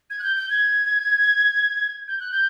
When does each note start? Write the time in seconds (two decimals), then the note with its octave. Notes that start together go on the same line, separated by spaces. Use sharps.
0.10 G#6
0.19 F#6
0.23 G6
0.37 G6
0.50 G#6
2.08 G6
2.20 F#6
2.31 G6